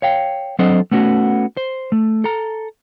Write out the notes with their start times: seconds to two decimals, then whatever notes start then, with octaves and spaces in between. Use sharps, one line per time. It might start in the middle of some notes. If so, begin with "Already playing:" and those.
0.02 C#5 F5 G5
0.59 F#3 C4 D4 A4 C5 D#5
0.91 A3 B3 C#4 F#4
1.57 C5
1.92 A3
2.24 A4 A#5